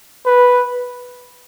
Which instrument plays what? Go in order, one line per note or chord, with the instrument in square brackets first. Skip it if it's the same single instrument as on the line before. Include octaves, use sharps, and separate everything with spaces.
[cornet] B4